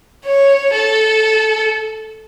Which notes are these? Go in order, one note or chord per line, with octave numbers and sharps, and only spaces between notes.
C#5
A4